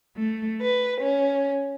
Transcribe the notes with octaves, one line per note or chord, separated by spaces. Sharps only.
A3
B4
C#4